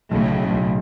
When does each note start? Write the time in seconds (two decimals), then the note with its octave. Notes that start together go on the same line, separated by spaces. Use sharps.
0.11 B1 A2 C#3
0.31 B1
0.50 B1